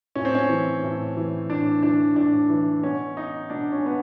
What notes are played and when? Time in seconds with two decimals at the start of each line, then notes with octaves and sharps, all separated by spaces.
0.15 A2 C#4
0.25 C4
0.35 C#4
0.49 E3
0.83 A2
1.17 E3
1.49 A2 D4
1.83 E3 D4
2.16 A2 D4
2.49 E3
2.83 B2 C#4
3.17 D#4
3.50 B2 D4
3.72 C#4
3.86 B3